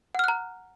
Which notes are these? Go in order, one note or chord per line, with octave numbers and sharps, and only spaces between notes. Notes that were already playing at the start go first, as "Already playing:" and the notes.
F#5 A#5 F6 F#6